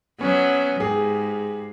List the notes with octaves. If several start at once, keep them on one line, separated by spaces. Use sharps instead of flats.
F#3 B3 C#4
G#2 G4 G#4